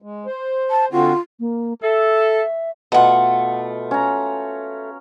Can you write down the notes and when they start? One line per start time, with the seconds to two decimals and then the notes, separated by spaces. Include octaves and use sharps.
0.02 G#3
0.26 C5
0.71 A5
0.92 D3 C4 F4 F#4
1.40 A#3
1.82 A4 E5
2.92 B2 A3 F4 F#5
3.91 C#4 A#5